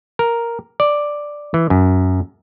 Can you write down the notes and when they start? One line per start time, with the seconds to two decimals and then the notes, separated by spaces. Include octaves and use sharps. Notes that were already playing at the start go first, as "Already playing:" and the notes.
0.19 A#4
0.80 D5
1.54 E3
1.70 F#2